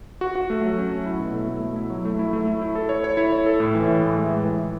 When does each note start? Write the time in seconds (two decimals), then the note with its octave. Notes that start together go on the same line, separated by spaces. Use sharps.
0.21 F#4
0.35 F#4
0.50 A3
0.63 F#3
0.78 C#4
0.92 F#3
1.06 E4
1.20 B2
1.34 A3
1.49 A3
1.63 A3
1.76 E4
1.90 F#3
2.05 A3
2.19 E4
2.33 A3
2.47 E4
2.61 E4
2.75 A4
2.89 C#5
3.04 C#5
3.17 E4
3.32 C#5
3.46 A4
3.60 A2
3.75 E3
3.88 A2
4.03 A2
4.16 G#3
4.30 A2
4.45 E3
4.59 E3